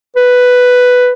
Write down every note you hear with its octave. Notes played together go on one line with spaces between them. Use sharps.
B4